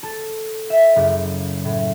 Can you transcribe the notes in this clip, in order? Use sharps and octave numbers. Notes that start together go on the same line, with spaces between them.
A4
E5
F#1
A2